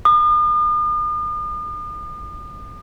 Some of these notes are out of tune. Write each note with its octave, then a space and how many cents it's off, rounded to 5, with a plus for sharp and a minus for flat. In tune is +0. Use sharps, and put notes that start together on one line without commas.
D#6 -45